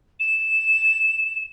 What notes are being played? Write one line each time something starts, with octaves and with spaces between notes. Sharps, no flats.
E7